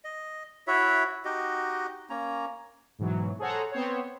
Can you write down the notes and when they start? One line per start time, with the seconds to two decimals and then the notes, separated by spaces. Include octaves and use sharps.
0.04 D#5
0.67 E4 F#4 C#5 E5
1.25 D#4 F#4 G4 D#5
2.10 A#3 C#4 A#5
2.99 G#2 B2 E3 F#3
3.39 G#4 A4 C5 C#5 F#5 A#5
3.72 B3 C4 C5 C#5